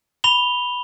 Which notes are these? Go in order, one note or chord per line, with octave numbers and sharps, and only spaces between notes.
B5 F7 G7